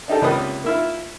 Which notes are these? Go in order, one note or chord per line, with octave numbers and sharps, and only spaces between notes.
D4 D#4 G4 A4
C#2 C3 G3 A#3 B4 D#6
A#3 E4 F4